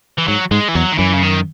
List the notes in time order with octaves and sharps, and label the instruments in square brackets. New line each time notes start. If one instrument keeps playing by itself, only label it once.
[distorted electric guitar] E3
[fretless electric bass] G#2 [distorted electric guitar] F#3
[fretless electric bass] G#2 [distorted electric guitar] G#3
[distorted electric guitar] E3
[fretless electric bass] E2 [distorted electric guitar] F#3
[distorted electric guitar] D#3
[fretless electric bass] F#2 [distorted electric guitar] E3
[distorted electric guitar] C#3
D#3